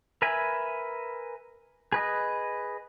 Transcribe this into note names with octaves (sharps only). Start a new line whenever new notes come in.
A#4 B4 E5 G#5 B5
G#4 B4 D#5